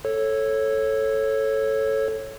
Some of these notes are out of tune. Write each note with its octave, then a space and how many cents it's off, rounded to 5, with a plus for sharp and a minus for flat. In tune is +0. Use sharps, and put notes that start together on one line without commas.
A4 +0 C#5 -15